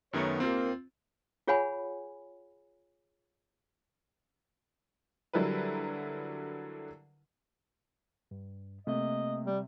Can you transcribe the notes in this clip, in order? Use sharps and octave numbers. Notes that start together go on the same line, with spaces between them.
F#2 D#3 F#3 A3 B3 C#5
D#2 A#3 C4 F4
F4 G#4 C#5 F#5 G#5 B5
D3 F#3 G3 E4 A#4 B4
G2
C3 A3 A#3 D#5
G3